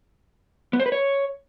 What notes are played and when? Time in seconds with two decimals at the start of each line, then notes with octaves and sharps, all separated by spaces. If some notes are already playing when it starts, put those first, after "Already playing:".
0.73 B3
0.80 C5
0.86 B4
0.92 C#5